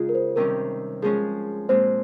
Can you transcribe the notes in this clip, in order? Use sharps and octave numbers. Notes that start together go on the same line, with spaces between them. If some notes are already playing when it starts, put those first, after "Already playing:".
Already playing: C#3 G#3 D#4 F4 G#4
A#4
C5
C3 D#3 G3 C#4 A#4
F3 G#3 C#4 G#4
A#2 G#3 C4 C5